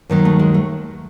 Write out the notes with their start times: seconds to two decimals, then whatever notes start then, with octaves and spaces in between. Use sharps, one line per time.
0.10 D#2 D#3 F#3
0.25 A3
0.39 G#3
0.54 A3